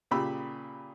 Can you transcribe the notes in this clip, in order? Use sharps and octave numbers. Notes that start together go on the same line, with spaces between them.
A#2 C#3 G4 B5 E6